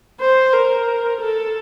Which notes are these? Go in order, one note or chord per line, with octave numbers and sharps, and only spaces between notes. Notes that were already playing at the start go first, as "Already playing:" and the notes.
C5
A#4
A4